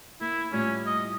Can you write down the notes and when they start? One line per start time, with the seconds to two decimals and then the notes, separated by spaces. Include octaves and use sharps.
0.21 A#3 E4
0.52 A2 G3 C#4 F4
0.87 D#5